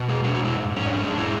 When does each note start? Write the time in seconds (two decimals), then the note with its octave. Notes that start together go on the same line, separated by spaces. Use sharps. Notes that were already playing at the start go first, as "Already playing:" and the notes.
Already playing: B2
0.09 G#3 G#4
0.24 G#3 F#4
0.34 F#4
0.40 B2 E4
0.56 G#2
0.71 G#2
0.76 C#4
0.86 G#2 D4
0.97 C#4
1.02 G#3 D4
1.18 G#3 E4